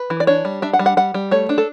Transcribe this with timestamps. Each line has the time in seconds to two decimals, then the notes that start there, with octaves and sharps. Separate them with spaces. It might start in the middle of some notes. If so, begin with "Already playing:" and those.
Already playing: B4
0.10 E3
0.20 D5
0.27 D4 C#5
0.45 G3
0.62 D4 E5
0.73 F#5
0.79 G3
0.86 F#5
0.97 G3 F#5
1.14 G3
1.31 A3 C#5
1.49 D4
1.58 A4